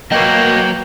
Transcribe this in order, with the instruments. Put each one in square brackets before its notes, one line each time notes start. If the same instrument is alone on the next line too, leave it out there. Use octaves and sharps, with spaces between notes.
[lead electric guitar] F#3 C#5 [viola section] A#3 [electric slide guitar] B4 D#5 [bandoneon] G5